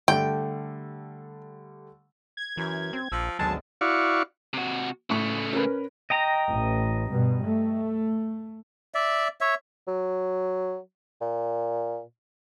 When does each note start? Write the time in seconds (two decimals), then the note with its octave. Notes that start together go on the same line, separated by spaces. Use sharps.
0.08 D3 G3 A3 G5
2.37 G#6
2.57 F#2 E3
2.93 C4
3.12 A#1 F3 E6 C#7 D7
3.39 G#1 D2 F#3 G#3 B3 A5
3.81 E4 F#4 D5 F5 C#6
4.53 C3 F#4
5.10 A2 C#3 A3 C#6
5.53 C#4 A#4 B4
6.10 D#5 G5 A#5
6.49 A1
7.09 G2 B2
7.44 A3
8.94 D5 E5
9.41 C#5 E5
9.88 F#3
11.21 A#2